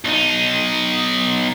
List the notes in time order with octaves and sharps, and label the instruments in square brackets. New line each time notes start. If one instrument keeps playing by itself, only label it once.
[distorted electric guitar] B1 D#4